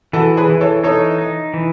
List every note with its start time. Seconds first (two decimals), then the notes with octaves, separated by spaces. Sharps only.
0.13 E3 F#4 A4
0.37 G#4 B4
0.50 E3
0.61 A4 C#5
0.84 D#4 A4 C#5
1.18 D#4
1.54 E3